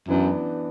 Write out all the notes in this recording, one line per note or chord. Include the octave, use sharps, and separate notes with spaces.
F#2 E3 B3 D4